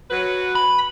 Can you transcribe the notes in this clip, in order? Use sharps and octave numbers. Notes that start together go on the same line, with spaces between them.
F#3 B4
B5